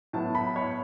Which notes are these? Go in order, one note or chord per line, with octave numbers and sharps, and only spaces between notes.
A2 F#3 B3 A5
B5
C#5